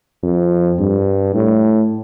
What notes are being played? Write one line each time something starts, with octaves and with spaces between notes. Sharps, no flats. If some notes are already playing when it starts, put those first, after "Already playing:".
F2
G2
A2